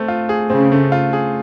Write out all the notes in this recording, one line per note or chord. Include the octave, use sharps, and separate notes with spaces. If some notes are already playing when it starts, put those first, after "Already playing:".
Already playing: A3 C4
F4
G#4
C#3 C4
A3
F4
G#4